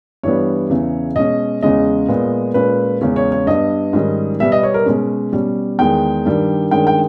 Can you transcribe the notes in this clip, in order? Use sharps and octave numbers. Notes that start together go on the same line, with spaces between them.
G2 E3 G3 B3 C#5
E2 C#3 E3
B2 G#3 C#4 D#5
E2 C#3 G#3 C#4 D#5
A#2 G#3 B3
A#2 G#3 C#4 B4
E2 C#3 G#3 C#4
C#5
C#5
G2 G3 B3 D#5
G#2 D#3 G3 C#4
B2 G3 B3 E5
D#5
C#5
A#4
B2 G#3 C#4
B2 G3 C#4
E2 D#3 G#3 G5
G2 D#3 G3
G2 D#3 G#3 C#4 G5
G5